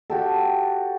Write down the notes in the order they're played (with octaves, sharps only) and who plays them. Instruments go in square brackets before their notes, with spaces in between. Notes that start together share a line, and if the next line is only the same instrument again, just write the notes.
[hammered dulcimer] F#4 G4 A4